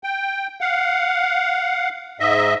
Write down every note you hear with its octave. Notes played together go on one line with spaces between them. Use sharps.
G5
F5 F#5
G#2 D#5 E5